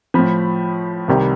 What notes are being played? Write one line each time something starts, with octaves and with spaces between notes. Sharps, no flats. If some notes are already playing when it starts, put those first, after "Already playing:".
A2 F3 B5
C2 C3 D#3 G3